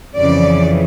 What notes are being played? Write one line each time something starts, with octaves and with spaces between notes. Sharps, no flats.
F2 C#3 E3 D5